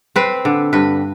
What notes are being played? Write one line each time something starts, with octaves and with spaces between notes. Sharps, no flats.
C4 B4
D3
G2 B4